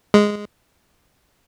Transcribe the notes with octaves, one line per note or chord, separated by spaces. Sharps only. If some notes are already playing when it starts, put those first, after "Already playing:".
G#3